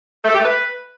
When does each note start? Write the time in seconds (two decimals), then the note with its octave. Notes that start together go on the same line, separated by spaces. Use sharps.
0.24 A3
0.29 A4
0.34 G4
0.39 A3
0.44 B4